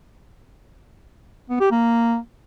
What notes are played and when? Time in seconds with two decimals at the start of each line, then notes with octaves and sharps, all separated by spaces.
1.50 B3
1.60 G4
1.71 A#3